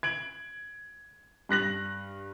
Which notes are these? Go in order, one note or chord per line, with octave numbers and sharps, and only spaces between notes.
G#6 D7 F#7
G2 F#6 A#6 F#7